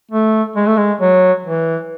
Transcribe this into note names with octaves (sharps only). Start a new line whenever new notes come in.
A3
G#3
A3
G#3
F#3
E3